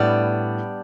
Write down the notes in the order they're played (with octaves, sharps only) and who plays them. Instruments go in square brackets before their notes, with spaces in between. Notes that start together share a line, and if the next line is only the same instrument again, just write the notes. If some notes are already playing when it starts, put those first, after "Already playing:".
Already playing: [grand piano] A2 [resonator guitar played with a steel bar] G3 B3 D4